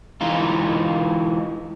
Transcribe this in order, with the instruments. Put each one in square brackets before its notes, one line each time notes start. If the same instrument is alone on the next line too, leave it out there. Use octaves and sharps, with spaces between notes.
[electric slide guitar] E3 G#3 D#4 F4